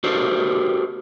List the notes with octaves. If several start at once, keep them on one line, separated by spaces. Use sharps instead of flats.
F#4 G4 A4 A#4 C5